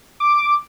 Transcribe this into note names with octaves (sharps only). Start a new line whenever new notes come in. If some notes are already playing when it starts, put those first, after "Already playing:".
D6